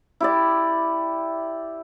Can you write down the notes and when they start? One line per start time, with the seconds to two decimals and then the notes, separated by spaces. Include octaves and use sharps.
0.20 E4 G4 D5